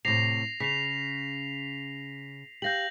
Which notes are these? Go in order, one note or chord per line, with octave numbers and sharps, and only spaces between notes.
A2 C3 A#6 C7 F7
C#3 B6 C7 F7
G4 F5 G6 A#6 F#7